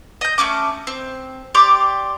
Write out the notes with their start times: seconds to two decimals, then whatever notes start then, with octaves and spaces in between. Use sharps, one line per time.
0.21 D#5 G6
0.38 A3 C4 C#4 D6
0.87 C4
1.55 G4 D5 C6 D6